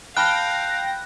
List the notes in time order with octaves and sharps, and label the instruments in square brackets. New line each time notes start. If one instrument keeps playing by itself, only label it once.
[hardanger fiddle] F5 [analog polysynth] G5 A#6 [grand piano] A5 B5 F6 [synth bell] F#6